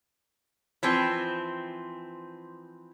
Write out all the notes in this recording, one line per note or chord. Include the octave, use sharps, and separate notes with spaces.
E3 F3 C4